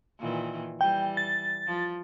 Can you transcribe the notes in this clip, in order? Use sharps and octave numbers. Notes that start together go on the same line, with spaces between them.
A#2 D#3 E3
E3 G3 G5
A6
F3